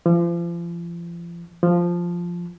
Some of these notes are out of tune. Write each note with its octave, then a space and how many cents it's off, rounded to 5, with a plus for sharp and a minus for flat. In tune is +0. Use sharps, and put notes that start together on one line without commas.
F3 -35
F3 +0